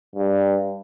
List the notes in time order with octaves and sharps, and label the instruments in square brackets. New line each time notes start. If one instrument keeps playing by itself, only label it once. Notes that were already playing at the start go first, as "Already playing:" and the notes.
[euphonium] G2